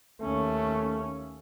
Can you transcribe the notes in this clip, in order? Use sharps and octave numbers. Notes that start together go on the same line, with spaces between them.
D#2 A3 C#4